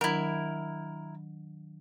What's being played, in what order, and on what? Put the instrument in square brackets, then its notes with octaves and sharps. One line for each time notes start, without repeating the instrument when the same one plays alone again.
[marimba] D#3 F#3 D4 [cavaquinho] E4 A#4